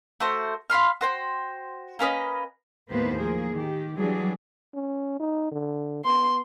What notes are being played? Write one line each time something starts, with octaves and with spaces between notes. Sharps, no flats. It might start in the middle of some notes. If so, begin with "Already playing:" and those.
A3 F#4 C5
F5 B5 C6 F6
F#4 C5 G5
A#3 C#4 B4 D#5
D#2 A2 A#3 B3 B4 C5
F3 A#3 G#4
D#3 G4
E3 F#3 G3 D4 G#4
C#4
D#4
D3
B3 C6